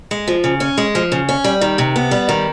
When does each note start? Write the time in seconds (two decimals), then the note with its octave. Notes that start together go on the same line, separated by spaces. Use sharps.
0.11 G#3
0.28 F3
0.44 C#3
0.60 C#4
0.78 G#3
0.95 F3
1.12 C#3
1.29 C#4
1.44 G3
1.61 D#3
1.78 C3
1.96 B3
2.11 G3
2.29 D#3